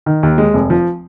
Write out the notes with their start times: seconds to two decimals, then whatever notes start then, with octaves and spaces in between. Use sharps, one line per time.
0.06 D#3
0.23 D#2
0.38 G#3
0.54 F1
0.70 F3